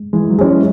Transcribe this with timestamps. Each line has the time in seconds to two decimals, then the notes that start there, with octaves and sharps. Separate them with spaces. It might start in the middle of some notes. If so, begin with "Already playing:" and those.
Already playing: G#3
0.13 E3 G#3
0.30 F#3
0.39 G#3 C#4 E4 G#4